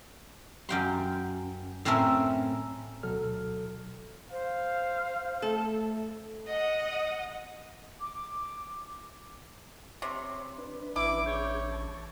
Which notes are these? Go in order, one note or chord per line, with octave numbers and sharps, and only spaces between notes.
F#2 G5 C6
A2 C4 C#4 A#4 E5
D2 B2 F#3 A4 F6
C5 F5
A3 A4 E5
D#5 F#5 D#6
D6
C3 C#5 C6 C#6
D4 B4
A1 E4 D6
D4 G#4 C#5 G6
A5 C#6